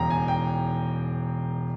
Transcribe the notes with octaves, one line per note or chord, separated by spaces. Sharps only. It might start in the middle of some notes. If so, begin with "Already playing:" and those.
Already playing: E1 E2 C#3 E3 G5 A#5
G#5
G5